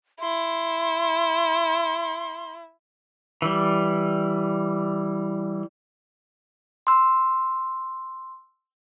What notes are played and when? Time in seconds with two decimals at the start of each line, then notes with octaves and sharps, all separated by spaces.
0.21 E4 C6
3.42 E3 G3
6.87 C6 E6